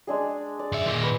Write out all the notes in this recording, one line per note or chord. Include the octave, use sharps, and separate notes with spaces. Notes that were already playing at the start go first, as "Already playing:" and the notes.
G#3 D4 G#4
D5
F#2 E5
A#2 D#3
B4